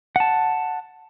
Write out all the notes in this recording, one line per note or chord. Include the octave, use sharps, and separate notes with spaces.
F#5 A5